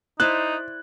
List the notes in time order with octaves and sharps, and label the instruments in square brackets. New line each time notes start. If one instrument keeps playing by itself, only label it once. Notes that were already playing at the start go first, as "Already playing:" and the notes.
[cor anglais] D#4 [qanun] E4 C5 D5 [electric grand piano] F#6